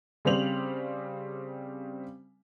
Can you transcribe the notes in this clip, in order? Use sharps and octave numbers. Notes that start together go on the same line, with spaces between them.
C#3 G3 C4 C5 F7 F#7